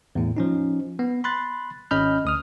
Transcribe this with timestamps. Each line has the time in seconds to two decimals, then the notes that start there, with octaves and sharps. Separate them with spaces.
0.15 E2 A2
0.37 F3 C#4 D#4
0.99 B3
1.24 B5 C6 F#6 A6
1.91 G#1 C#4 D#5 B5 F6 G6
2.25 D2 D#6 F6